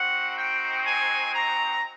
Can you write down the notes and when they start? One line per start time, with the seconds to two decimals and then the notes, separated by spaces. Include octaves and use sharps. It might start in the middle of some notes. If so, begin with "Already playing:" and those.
Already playing: C4 D#4 F#4 F#5
0.38 G5
0.86 G#5
1.33 A#5